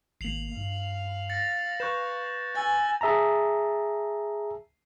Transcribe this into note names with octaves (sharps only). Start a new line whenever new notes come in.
G#1 A#3 C7 F7 F#7
G2 F5
A6 A#6 C#7
B4 C#6 F#6 G6 E7
G#5 E6 A6
G#4 E5 A5 A#5